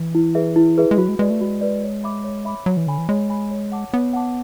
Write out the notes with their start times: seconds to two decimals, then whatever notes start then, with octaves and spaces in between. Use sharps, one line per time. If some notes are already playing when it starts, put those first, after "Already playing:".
Already playing: E3
0.15 E4
0.35 G#4 B4 E5
0.56 E4
0.78 G#4 B4 E5
0.91 G#3
0.98 F#3 F#4
1.08 G#3
1.19 G#3 B4 D5
1.30 A3
1.41 G#3 F#4
1.61 B4 D5
1.83 C#5
2.04 E5 B5 D6
2.24 C#5
2.45 E5 B5 D6
2.66 F#3 C#5
2.77 E3
2.87 D3 G#5 B5
2.98 E3
3.09 G#3 C#5
3.30 G#5 B5
3.51 C#5
3.72 F#5 A5 D6
3.93 B3 C#5
4.13 F#5 A5 D6